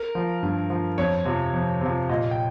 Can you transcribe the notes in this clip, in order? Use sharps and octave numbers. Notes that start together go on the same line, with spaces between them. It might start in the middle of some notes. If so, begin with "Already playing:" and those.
Already playing: A#4
F3
G2
F3
F2 C#5
C3 F3
F2
C3 F3
A#2 D#5
G5